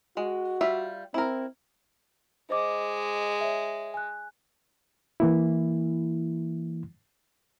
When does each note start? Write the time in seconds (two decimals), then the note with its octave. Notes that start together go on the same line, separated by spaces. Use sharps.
0.17 G#3 F#4
0.61 G3 F4 E5
1.14 C4 E4 A#4
2.50 G#3 C5 D#5 D6
3.41 C#5 E5
3.94 G#5 F#6
5.20 E3 A#3 E4